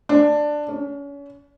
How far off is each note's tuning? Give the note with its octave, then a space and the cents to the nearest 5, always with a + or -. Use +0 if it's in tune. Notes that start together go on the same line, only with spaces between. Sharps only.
D4 +10
C#4 +35